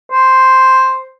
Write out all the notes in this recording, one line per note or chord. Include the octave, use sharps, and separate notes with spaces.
C5